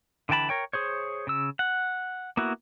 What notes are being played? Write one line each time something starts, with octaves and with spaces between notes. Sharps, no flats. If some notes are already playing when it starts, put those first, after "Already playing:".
D3 E3 G5 A5 B5
A#4 C#5 G5
G#4 C5 C#5
C#3 E6
F#5
A#3 B3 E4 F#4